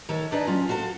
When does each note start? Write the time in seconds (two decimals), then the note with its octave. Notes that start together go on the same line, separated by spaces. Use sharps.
0.09 D#3 A4 C#5
0.32 D4 D#4 G#4 B4 D5 D#5
0.47 F#3 C#4 F4
0.67 F4 F#4 A4